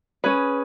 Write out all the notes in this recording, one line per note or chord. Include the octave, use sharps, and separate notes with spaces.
C#4 G#4 B4